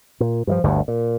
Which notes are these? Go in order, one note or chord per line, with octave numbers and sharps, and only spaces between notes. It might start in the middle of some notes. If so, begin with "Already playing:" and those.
A#2
G2 D#3 F3
G1 D2 G2
A#2